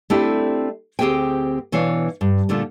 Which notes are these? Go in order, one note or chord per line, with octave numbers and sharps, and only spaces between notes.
A3 C4 D4 E4 G4
D2 C4 G4 G#4 C5 G5
B2 E3 D4 C#5 F5
G2
A#2 D3 A3 F4